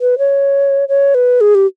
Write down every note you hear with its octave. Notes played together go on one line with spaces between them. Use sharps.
B4
C#5
C#5
B4
G#4
G4